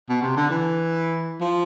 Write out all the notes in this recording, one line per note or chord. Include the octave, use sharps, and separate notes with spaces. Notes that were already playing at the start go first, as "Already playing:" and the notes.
B2
C3
D3
E3
F3